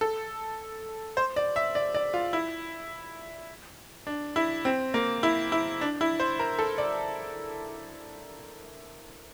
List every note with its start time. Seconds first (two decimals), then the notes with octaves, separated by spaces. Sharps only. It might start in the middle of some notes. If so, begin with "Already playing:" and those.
0.01 A4
1.17 C5
1.36 D5
1.56 E5
1.75 D5
1.95 D5
2.14 F4
2.33 E4
4.07 D4
4.36 E4
4.65 C4
4.94 A#3
5.23 E4
5.52 E4
5.81 D4
6.01 E4
6.20 C5
6.39 A#4
6.59 A4
6.78 D5